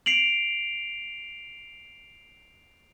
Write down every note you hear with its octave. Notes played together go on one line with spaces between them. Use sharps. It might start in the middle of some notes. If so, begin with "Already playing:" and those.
C7 D7 F7 F#7